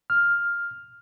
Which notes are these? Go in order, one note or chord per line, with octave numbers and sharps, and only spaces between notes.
F6